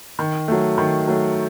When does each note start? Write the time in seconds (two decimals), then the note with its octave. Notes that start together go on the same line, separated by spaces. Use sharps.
0.19 D#3
0.48 F#3 A3
0.78 D#3
1.07 F#3 A3